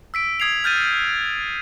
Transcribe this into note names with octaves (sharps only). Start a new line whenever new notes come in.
E6 B6 D7
D#6 G#6 C7 F7
F6 G6 A6 D#7